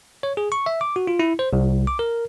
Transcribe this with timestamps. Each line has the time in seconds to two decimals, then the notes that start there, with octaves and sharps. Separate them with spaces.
0.23 C#5
0.37 G#4
0.52 C#6
0.66 E5
0.81 D6
0.96 F#4
1.07 F4
1.19 E4
1.39 C5
1.53 C2
1.87 D6
1.99 A#4